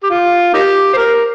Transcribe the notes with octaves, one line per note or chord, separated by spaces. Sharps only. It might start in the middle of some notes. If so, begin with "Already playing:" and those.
G4
F4
A#3 D#4 G4
C5
A#4